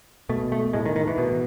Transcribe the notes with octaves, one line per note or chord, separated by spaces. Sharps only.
B2 A3
A3
A2 G#3
D#3
D#3
E3
B2